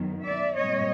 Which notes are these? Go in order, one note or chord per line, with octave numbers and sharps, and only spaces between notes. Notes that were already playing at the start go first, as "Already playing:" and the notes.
Already playing: F#2 D#3 F#3 B3
D5 E5
A#2 G3 C4 C#5 D#5